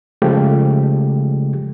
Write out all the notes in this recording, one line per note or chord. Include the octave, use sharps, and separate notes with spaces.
C#3 F3 G#3 A3 G4